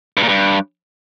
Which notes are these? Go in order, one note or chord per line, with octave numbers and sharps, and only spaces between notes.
G2
A#2
G2